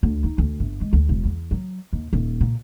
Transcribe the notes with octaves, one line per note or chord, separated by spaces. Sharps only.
D2
D#4
D2
G1
G#3
D2
E1
E2
F#3
D#2
D#1
A#2